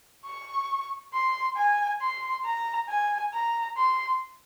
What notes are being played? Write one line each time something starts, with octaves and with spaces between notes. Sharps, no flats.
C#6
C6
G#5
C6
A#5
G#5
A#5
C6